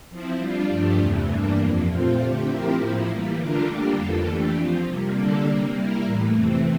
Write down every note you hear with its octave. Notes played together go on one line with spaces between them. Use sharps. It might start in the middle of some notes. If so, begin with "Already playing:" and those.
F3 C4 E4
G3 D4 F4
G2 F3 A3 D4 G4
E2 C3 E3 A3
G2 E3 G3 A#3 D4
F2 C3 F3 A#3
A#2 A3 C4 F4 C5
D3 A3 C4 G4
F3 C4 E4 G4 A#4
A2 F3 A#3 E4
E3 G3 A#3
D3 A3 D4 F4 A#4
D3 G3 A#3 D4 G4
F2 E3 A#3 F4 A4
E3 A3 D4 G4
F3 C4 F4
C3 G3 A#3
D3 G3 A#3 D4 A4
C3 G3 A#3
G3 A#3 E4 A#4
A2 E3 A3
F2 C3 E3 A3 C4